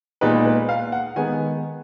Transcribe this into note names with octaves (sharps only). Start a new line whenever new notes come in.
A#2 G#3 B3 D#4 B4
B4
F5
F#5
D#3 G#3 B3 G#5